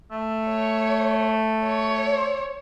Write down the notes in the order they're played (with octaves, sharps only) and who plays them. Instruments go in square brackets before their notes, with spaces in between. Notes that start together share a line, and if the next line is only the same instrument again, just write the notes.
[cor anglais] A3
[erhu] C#5
C#5